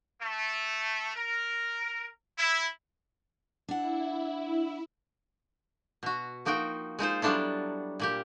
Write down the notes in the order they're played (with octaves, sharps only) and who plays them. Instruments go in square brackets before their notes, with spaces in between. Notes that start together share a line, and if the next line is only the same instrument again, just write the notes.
[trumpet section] A3
A#4
E4
[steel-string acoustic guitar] D4 F#5 [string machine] E4
[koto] B2 F#4
F3 A#3 D#4 F#4 G5
G#3 D#4 F4 C5
F#3 G3 B3 D4 E4 A4
A#2 A#3 G4